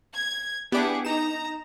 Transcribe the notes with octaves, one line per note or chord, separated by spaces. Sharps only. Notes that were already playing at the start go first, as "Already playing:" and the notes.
G#6
B3 D4 E4 G4 G#4 F#5 D6
D#4 A#5 E7